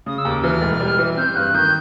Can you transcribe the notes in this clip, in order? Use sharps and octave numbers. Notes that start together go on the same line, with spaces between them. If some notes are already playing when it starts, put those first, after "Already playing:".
C#3 D#6
E6
D#2
D6
E3 F6
E1
G3
E3
C4 G6
G2 F#6
D#3 G6